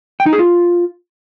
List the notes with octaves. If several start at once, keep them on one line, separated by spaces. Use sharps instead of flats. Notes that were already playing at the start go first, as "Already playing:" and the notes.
G5
D#4
G#4
F4